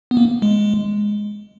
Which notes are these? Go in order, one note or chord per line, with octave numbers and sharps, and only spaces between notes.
B3
A#3
G#3